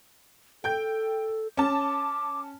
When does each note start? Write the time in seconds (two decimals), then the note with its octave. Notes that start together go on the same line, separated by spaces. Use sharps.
0.64 A4 G5 G6
1.57 C#4 A5 D6